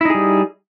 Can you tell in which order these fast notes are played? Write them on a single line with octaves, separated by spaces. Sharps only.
E4 D#4 G#4 G3